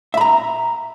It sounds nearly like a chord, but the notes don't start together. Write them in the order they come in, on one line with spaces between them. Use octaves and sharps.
E5 B5 A#5